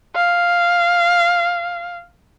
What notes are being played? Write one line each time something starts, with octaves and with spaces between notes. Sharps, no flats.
F5